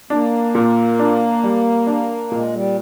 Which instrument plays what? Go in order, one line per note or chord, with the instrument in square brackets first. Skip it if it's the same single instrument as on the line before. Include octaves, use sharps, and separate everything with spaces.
[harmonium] A#3 [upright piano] D4
[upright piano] A#2
D4
G3
D4
[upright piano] A#2 [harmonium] G#3
[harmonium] G3